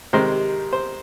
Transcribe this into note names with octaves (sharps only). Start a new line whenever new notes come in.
C3 D#3 G#3 C5
C5